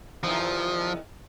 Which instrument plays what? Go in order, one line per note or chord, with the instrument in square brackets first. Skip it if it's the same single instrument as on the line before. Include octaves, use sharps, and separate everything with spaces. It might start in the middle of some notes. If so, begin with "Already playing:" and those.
[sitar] E2 C3 D#3 [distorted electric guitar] F3